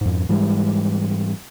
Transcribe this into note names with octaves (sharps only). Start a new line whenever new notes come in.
F2 G#2
G#2 E3 G3 G#3